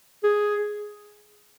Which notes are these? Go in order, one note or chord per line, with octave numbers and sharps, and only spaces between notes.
G#4